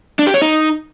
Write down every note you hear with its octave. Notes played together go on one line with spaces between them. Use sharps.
D4
G4
C#5
D#4